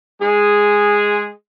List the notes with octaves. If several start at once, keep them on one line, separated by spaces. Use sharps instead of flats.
G#3 G#4